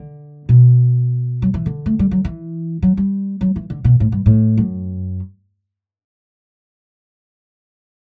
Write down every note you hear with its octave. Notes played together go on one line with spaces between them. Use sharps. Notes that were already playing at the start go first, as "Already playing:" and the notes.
Already playing: D3
B2
F#3
E3
D3
A3
G3
F#3
E3
F#3
G3
F#3
E3
D3
B2
A2
G2
A2
F#2